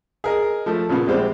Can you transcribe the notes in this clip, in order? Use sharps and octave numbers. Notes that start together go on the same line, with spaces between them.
G#4 A#4 D#5
F3 A3
A#2 C#3 B3
A#1 G3 G#3 C4 G4 C5